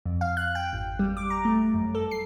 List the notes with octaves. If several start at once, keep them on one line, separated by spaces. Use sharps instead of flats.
F2
F5
F#6
G5
G#1
G3
D6
A#5
A3
F#2
A4
C7